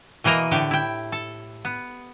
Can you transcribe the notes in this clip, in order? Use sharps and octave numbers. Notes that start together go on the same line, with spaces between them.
B2 E3 A#3 D#5 A#5
A2 D3 G4
E4 G5
A4
B3